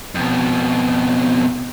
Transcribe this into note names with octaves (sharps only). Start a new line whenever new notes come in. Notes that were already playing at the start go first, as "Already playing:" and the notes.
F2 B2